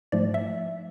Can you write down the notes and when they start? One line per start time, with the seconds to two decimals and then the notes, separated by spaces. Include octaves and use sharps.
0.12 G#2 F3 A3 D5
0.34 E5